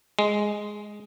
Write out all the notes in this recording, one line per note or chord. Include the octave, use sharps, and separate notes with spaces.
G#3